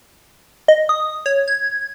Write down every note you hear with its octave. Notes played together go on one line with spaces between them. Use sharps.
D#5
D#6
C#5
G#6